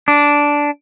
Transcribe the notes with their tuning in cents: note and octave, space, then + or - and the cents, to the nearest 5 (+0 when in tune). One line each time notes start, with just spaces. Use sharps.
D4 -10